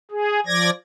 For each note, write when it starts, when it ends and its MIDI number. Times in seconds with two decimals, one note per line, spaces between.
0.11 0.40 68
0.46 0.70 53
0.46 0.70 74
0.46 0.70 92
0.46 0.70 94